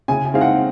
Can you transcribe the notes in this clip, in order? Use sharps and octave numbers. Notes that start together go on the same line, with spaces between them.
C#3 G#5
G#5
G#3 C4 D#4 F5
F#5